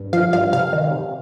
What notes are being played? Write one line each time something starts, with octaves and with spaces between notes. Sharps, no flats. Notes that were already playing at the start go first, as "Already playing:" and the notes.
Already playing: G2
F3 F5
G2 F5
C3 F5
D#3
C3